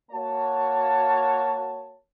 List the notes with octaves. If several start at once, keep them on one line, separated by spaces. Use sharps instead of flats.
A#3 F#4 C#5 A5